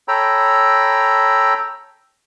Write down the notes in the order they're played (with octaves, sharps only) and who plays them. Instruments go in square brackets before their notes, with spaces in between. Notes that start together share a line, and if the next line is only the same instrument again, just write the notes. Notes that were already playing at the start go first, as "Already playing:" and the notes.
[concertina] A4 C#5 G5 A#5 B5 E6